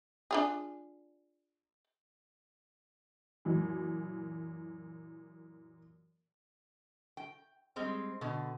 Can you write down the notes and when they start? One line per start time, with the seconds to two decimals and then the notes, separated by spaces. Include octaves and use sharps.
0.31 D4 F4 G#4
3.45 F#2 A#2 E3
7.17 G5
7.76 G3 G#3 C4
8.21 B2 D3